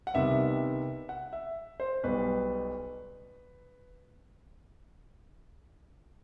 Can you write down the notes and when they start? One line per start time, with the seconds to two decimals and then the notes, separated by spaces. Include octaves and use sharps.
0.07 F#5
0.14 C2 C3 D#3 G3 B3 E5
1.09 F#5
1.33 E5
1.80 C5
2.04 B1 B2 G3 B3 B4